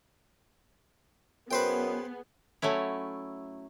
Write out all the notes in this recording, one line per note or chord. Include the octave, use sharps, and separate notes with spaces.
F#2 B3 G#4 B4 C5 G5
F#3 A3 C#4 E4